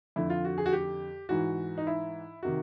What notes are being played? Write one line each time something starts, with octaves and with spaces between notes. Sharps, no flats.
F2 D3 E4
F4
F#4
G#4
F#4
G4
G#2 E3 F#4
D#4
E4
C3 D#3 F#4